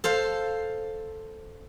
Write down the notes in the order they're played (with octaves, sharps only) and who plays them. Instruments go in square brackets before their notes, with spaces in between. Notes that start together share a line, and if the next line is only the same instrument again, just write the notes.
[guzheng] A4 C5 F5